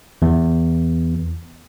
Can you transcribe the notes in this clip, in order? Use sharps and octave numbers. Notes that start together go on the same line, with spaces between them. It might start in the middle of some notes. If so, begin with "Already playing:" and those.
E2